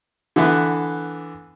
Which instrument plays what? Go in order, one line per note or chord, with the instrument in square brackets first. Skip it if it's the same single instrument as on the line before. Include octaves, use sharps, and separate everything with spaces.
[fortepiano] D3 E3 B3